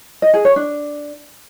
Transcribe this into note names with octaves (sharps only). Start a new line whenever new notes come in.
D#5
G#4
C#5
D4